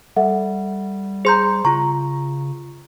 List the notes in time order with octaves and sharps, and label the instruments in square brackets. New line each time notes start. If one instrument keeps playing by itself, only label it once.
[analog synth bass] G3 [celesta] A4 E5 F#5
[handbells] G#4 C6 G6 [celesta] C5 A#5
[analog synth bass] C#3 [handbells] F4 C#6 [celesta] A#5